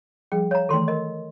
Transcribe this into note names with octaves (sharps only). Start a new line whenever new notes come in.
F3 G3 G#4 G5
C#5 F5 A#5
D#3 E3 A3 A4 C6
A#4 D#5